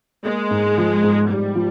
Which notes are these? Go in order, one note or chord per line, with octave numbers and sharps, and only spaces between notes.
G#3 A#3
G#2
F3
G#2
G#2 G3
F3